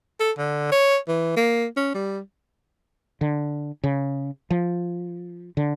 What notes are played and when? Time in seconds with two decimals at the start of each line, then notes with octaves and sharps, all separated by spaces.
0.20 A4
0.38 D3
0.72 C#5
1.08 E3
1.36 A#3
1.77 C#4
1.95 G3
3.21 D3
3.83 C#3
4.50 F3
5.57 D3